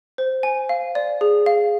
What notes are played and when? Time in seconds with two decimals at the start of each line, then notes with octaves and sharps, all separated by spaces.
0.18 C5
0.43 G#5
0.69 F5
0.95 D5
1.21 G#4
1.46 F5